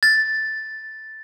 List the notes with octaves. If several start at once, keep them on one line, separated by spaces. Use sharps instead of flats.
A6